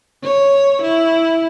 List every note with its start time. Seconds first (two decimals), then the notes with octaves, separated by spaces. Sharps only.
0.24 C#5
0.83 E4